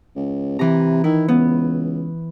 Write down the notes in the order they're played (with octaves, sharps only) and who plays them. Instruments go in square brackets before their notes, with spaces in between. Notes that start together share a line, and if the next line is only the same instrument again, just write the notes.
[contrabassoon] C#2
[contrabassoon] C3 [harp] E3 A#5
[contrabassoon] D#3 [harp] E4
[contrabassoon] C#2 [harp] B3